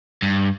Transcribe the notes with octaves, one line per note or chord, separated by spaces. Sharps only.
G2